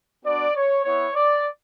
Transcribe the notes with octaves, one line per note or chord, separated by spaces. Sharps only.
B3 D4 F#4 D5
C#5
B3 E4 C#5
D5